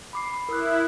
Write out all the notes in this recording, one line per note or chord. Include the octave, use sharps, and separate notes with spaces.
B5 D6 C7
E4 A#4 D#6 F#6